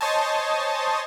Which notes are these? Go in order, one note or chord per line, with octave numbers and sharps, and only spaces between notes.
C5 C#5 D#5 G#5 A5